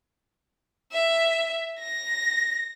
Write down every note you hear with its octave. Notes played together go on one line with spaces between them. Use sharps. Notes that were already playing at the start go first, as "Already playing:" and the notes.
E5
A#6